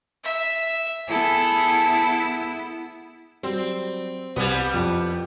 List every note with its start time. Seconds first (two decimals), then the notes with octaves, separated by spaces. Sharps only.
0.24 E5
1.08 B3 E4 G#4 A4
3.43 F#3 G3 C4
4.36 C2 G3 B3 G#6
4.74 F2